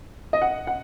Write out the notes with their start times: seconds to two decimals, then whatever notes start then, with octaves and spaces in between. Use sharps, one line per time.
0.33 D#5
0.42 F#5
0.67 F#5